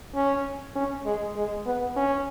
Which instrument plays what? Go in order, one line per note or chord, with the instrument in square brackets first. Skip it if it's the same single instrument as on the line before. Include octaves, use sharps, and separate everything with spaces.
[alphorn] C#4
C#4
G#3
G#3
B3
C#4